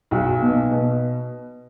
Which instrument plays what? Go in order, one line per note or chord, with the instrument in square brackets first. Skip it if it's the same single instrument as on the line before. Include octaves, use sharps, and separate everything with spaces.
[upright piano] B1 F#4
B2 B3
B2